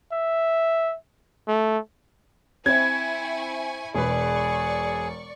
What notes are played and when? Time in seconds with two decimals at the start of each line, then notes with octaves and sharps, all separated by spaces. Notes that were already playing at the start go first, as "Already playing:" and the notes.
0.12 E5
1.48 A3
2.66 C4 E4 G#5 C#6 G#6
3.95 E1 G#4 B4 D5 C#6